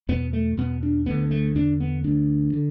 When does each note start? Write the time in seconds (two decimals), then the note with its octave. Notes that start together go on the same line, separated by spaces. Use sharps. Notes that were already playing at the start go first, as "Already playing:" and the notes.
0.09 E2 B2 B3
0.33 A3
0.57 E2 B2 B3
0.83 D4
1.06 D2 D3 B3
1.31 A3
1.55 E2 D3 D4
1.80 B3
2.04 D2 D3 D4
2.53 D3